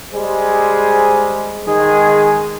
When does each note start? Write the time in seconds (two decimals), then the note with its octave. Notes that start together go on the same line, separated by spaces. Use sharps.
0.12 G3 G#3 G#4 C5
1.66 D#3 G#3 G#4